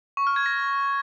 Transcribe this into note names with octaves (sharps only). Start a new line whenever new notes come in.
C#6
F6
G#6
A#6